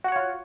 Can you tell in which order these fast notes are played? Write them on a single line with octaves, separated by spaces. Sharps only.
F#4 F#5 C#5 F4